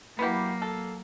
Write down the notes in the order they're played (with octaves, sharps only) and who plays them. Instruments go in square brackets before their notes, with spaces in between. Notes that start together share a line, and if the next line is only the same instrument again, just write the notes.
[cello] F#3 A#3 [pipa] B3 E4 G4
[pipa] A4